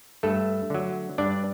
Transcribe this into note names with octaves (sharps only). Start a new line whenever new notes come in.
G2 A3 A4
D3 F#3
G2 D4 D5